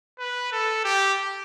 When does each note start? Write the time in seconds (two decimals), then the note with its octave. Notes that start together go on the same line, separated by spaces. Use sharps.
0.19 B4
0.52 A4
0.84 G4